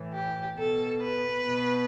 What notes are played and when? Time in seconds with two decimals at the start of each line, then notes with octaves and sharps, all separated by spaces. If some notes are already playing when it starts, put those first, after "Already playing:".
Already playing: A2 E3
0.14 G4
0.58 B2 A4
1.02 B4
1.46 B2